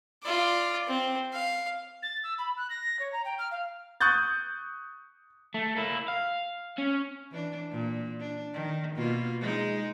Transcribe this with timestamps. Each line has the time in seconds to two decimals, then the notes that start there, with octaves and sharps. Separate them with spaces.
0.23 F4 D5
0.87 C4
1.33 F5
2.02 A6
2.23 E6
2.38 B5
2.57 F#6
2.70 A#6
2.99 C#5
3.12 A#5
3.25 G5
3.38 F6
3.51 F5
4.01 C#6 D#6 F#6 G6 A6
5.54 A3
5.76 A#3 E4
6.08 F5
6.78 C#4
7.31 E3 D4
7.72 A#2
8.20 D4
8.54 D#3
8.96 B2 A#3 F4
9.41 G#3 D#4